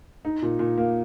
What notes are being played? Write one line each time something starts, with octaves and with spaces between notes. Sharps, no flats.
D#4
A#2
A#2
A#3